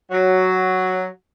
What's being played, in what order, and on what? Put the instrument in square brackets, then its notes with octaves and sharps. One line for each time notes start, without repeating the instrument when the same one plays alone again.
[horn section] F#3